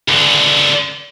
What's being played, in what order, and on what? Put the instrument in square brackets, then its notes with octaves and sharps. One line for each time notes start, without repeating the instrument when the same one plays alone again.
[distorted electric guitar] C#2 D3